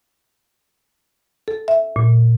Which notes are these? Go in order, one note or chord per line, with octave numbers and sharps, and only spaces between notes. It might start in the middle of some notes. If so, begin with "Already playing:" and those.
A4
E5
A#2